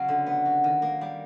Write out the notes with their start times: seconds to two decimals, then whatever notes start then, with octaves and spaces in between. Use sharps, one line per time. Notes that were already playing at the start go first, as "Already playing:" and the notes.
Already playing: C#3 F#3
0.08 D3
0.26 B3
0.45 F#3
0.64 D#3
0.82 A#3
1.01 G3